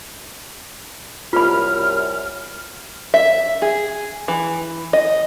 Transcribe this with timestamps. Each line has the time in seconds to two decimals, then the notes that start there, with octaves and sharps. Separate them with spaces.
1.33 C2 F#2 F4 B5 F6
3.14 E5
3.62 G#4
4.28 E3
4.93 D#5